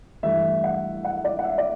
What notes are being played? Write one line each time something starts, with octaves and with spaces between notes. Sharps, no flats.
G2 E3 A3 E5
F#5
F#5
D5
F#5
E5
D5